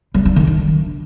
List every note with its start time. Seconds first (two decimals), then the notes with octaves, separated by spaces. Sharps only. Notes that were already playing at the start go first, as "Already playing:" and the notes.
0.14 G3
0.25 D4
0.36 D#3
0.47 D4